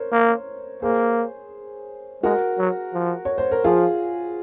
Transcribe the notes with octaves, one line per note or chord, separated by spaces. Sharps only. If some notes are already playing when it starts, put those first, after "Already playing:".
Already playing: A#4 C5 C#5
A#3
A#3 G#4 C5
G#3 F#4 A#4
F#3
F3
C#5
C5
A#4
F3 F4 G#4